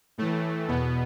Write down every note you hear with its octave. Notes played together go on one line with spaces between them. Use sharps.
A2 E3 A3
E2 B2 B3